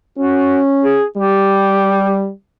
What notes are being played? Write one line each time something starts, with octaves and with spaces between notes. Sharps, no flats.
C#4 F#4
G#4
G3 G4